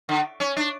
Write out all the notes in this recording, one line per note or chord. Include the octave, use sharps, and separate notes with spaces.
D3
C#4
D4